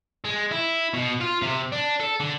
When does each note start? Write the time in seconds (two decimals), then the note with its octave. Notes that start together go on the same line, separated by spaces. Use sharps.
0.24 G#3
0.51 E4
0.94 B2
1.21 F4
1.42 C3
1.72 D4
2.00 A4
2.20 D3